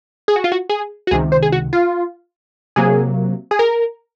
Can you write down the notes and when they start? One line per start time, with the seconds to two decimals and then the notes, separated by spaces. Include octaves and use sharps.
0.28 G#4
0.36 F#4
0.44 F4
0.52 F#4
0.69 G#4
1.07 F#4
1.11 C#2 C3 D#3 G#4
1.32 C5
1.43 G#4
1.52 F#4
1.73 F4
2.76 C3 F#3 A#3 G#4
3.51 G#4
3.59 A#4